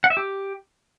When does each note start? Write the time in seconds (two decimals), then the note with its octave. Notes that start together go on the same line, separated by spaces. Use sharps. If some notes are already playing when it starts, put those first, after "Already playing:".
0.04 F#5
0.10 E5
0.17 G4